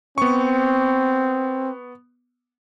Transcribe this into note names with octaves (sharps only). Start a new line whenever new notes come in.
B3 C4 C#6